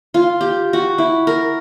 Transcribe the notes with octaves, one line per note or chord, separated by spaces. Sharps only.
F4
G4
F#4
E4
A#4